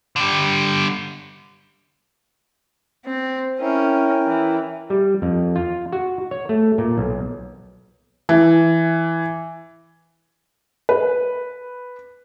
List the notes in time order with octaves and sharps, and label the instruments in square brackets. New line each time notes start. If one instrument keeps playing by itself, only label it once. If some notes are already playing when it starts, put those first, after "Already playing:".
[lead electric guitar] D3 G3
[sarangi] C4
[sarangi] C#4 [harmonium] E4 A#4 G5
[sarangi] E3
[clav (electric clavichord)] G3
F2
F4
F#4
C#5
A3
A#2
B1
[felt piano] E3
B4